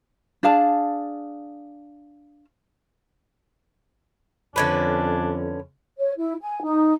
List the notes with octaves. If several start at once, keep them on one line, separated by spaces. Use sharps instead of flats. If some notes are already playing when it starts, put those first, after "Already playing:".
D4 G#4 F5 A5
F2 D3 C#4 D4 B4
C#5
E4
G#5
D#4